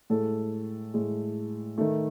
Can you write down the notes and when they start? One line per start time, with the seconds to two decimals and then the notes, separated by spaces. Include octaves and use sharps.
0.10 A2 G#3 A4
0.94 A2 G#3
1.78 D#3 A3